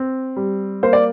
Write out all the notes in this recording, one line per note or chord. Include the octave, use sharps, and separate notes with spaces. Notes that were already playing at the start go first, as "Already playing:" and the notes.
Already playing: C4
G3
A#3 C5
D5